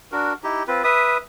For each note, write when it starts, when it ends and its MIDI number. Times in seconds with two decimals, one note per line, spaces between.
0.12 0.33 62
0.12 0.33 66
0.12 0.33 70
0.43 0.63 63
0.43 0.63 64
0.43 0.63 67
0.68 0.82 60
0.68 0.82 65
0.68 0.82 71
0.84 1.17 71
0.84 1.17 76
0.84 1.17 87